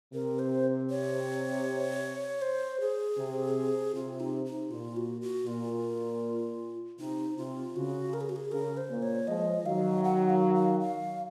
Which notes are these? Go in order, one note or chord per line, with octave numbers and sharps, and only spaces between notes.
C3 A#4
C5
C#5
C5
G#4
C3
C3 F4
D#4
D#4
A#2 F4
F#4
F#4
A#2 F4
C3 D#4
C3 F4
C#3 F#4
A#4
G#4
F#4
G#4
C#3 A#4
C5
A#2
C#5
F3 G#3 D#5
D#3 F#3 F5
F#5
F5
F5
F5